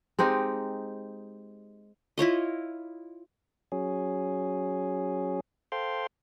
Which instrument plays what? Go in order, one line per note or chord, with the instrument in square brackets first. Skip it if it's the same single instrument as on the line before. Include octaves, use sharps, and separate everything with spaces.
[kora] G#3 C4 D#4 G4
[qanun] E4 F4 C#5 D#5
[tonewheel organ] F#3 C#4 G#4
A4 C5 F5 G5 C6